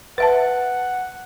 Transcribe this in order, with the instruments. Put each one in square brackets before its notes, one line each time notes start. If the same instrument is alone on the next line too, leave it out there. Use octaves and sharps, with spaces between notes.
[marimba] B4 E5 A5 [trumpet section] F#5